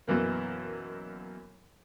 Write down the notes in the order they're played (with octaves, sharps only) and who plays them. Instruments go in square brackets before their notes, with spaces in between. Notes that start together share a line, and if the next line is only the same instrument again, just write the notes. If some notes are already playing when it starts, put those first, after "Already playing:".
[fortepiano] F#2 B2 E3 A#3